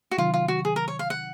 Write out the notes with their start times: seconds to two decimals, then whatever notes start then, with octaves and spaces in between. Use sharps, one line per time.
0.11 F#4
0.18 C3 D#3 F#3 F4
0.34 F4
0.48 F#4
0.65 G#4
0.76 A#4
0.88 C#5
0.99 F5
1.10 F#5